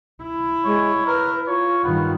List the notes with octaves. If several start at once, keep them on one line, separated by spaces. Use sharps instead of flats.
E4
G#3 C#5
A#4 B4
F4 C#5
G2 D#3 B3